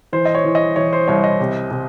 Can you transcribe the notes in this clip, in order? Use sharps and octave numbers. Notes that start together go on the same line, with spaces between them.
E3 C5
D#5
C#5
E3
D#5
E3 C#5
C5
C2 C#5
D#5
C3
C3